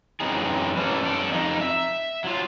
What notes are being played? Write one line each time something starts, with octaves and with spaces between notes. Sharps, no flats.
F#2 D3 E3 C4 D#4 G#4
E3 A#3 C#4 A4
F#2 A4 D5
F2 D#4
E5
F#3 F4